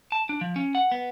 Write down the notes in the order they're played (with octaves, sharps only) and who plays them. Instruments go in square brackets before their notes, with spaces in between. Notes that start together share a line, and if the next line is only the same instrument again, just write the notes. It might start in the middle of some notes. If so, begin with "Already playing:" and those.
[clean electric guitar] A5
D4
F3
C#4
F#5
B3